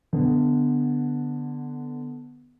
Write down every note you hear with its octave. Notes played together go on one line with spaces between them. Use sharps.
D3 B3